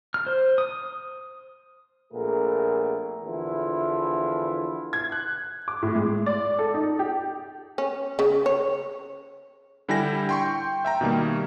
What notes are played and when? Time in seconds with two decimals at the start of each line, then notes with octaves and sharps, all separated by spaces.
0.14 F6
0.26 C5
0.58 D#6
2.13 A#1 A#2 A3 B3 G#4 A#4
3.24 E2 D3 E3 F3 E4 F4
4.93 G#6
5.12 F#6
5.68 D6
5.83 A2
5.95 G#3
6.26 D5
6.59 A4
6.74 D#4
6.99 G4
7.78 C#4
8.19 C#3
8.46 C#5
9.89 D3 G3 E4 G5 G#5 A#6
10.29 G5 C6 C#6
10.85 E5 G5 A#5
11.01 B2 D#3 G3 A#3